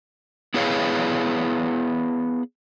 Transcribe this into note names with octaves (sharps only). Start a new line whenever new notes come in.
B3 E4 G#4 B4 C#5 F5